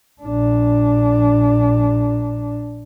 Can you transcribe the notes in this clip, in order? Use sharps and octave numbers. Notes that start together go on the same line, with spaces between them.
A#1 D4